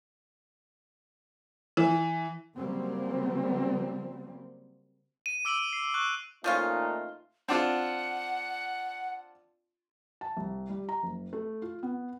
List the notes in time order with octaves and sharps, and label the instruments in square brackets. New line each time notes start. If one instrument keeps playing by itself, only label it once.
[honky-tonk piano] E3
[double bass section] C#3 F#3 G3 A#3 C4
[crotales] D#7
D6 E6 D7 D#7 F#7
C7
C#6 F#6
[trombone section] A#2 A3 D#4 [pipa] F3 C#4 F4
[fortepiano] C4 D4 F4 [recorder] F#5
[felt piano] A5
C2
G3
A#5
F#1
A3
F4
B3